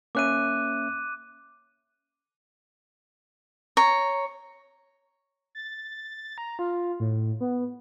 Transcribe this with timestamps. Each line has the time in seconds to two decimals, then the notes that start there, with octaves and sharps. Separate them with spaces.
0.15 A#3 C#4 E5 D6 F#6 D#7
3.77 C#5 A#5
5.55 A6
6.38 A#5
6.59 F4
7.00 A2
7.40 B3